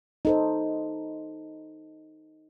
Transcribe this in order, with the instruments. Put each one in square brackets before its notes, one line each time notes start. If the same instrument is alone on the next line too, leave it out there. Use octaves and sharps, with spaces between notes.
[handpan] D#4 A4 C5